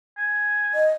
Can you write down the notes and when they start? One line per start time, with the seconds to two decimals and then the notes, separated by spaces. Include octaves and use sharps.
0.18 G#5
0.74 D#5